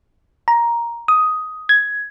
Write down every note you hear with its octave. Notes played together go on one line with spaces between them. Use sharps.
A#5
D#6
G#6